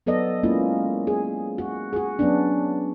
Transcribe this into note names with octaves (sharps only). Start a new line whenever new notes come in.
F#3 B3 A4 D5 D#5
G#3 A#3 C#4 E4 F4
G#4
F#4
F#4 G#4
F#3 B3 C#4 D4